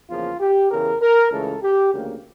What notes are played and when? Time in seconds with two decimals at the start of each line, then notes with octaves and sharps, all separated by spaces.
0.09 E2 C#3 F3 A#3 F4
0.40 G4
0.70 E2 C#3 E3 A#4
1.01 A#4
1.31 C#2 C#3 E3 A3 A4
1.62 G4
1.93 D2 C#3 F3 A#3